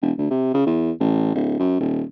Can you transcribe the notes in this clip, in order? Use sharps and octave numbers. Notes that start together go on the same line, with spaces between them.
E1
D2
C3
C#3
E2
A1
D1
F#2
D#1